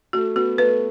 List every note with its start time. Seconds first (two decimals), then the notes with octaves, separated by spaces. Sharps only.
0.13 A3 F#4
0.36 B3 F#4
0.58 A3 B4